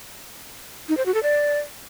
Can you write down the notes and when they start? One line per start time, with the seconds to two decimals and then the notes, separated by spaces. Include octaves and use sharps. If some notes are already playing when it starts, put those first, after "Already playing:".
0.89 D#4
0.97 C5
1.06 F#4
1.14 A4
1.23 D5